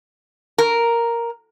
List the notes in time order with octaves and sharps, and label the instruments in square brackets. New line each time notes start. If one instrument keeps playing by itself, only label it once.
[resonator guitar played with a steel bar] A#4